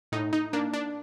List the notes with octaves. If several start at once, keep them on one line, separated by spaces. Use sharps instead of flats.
A2 D#4
D#4
A#3 D4
D4